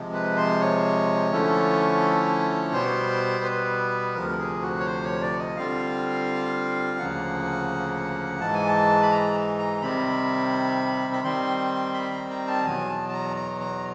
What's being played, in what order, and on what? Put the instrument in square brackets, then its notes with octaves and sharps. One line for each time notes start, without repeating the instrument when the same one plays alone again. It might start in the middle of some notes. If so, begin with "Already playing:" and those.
Already playing: [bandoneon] C3 F3 G#3
B4
C5
C#5
D3 F3 A3 C#4 E4
B2 G3 B3 C5
B4
D2 C3 F3 A#4
G#4
F#4
C#5
C5
C#5
D5
D#5
D3 G3 C4 F4 F5
D2 C#3 F3 A#3 F#5
G#2 E3 G#3 A5
G#5
A5
B5
A#5
A#5
C3 D#3 G3 C4 B5
B5
D#3 G3 C4 C6
B5
A#5
A#5
A5
E2 B2 F#3 G#5
A5
A5
A#5
A#5
A#5